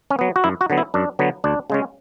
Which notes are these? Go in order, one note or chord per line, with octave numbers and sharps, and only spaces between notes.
C#4
F#3 B3
F#4
F#2 E4
F#4
D3 F#3 B3
E4
F#2 D4
D3 F#3 B3
D2 D4
C#3 G#3 C#4